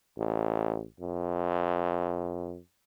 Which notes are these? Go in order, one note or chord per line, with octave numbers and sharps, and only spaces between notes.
A1
F2